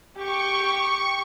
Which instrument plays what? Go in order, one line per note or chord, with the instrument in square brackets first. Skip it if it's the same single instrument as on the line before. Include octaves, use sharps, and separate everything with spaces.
[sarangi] G4 [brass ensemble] G5 [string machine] C#6